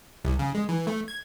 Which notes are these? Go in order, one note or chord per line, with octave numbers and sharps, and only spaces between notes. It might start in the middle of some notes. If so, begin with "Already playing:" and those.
C2
C#3
G#3
E3
A3
G#6